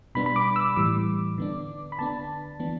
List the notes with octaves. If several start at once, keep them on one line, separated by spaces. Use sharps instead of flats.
B2 G3 B3 D4 B5
B5
D6
E6
A2 E3 G3 D6
D3 B3 D4
B5
D3 B3 D4 A5
E3 B3 D4